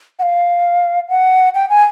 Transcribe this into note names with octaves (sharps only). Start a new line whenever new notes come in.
F#5
F5
F#5
G5
G#5